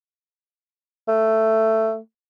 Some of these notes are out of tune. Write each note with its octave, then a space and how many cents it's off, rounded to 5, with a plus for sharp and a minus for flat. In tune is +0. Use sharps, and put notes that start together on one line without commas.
A3 +10